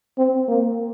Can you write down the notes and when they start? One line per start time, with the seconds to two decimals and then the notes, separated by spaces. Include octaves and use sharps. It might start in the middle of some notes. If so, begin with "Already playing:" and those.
0.18 C4
0.49 A#3